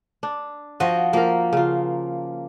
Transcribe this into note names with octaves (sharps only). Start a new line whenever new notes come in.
D4
F3 F#4 D#5
F3 A#3 A#4
C#3 F4